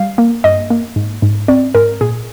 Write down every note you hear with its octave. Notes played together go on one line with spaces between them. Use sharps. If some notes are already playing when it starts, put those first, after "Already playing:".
Already playing: G3 F5
A#3
G2 D#5
A#3
G#2
G#2
C4 D5
G#2 A#4
A#2 G#4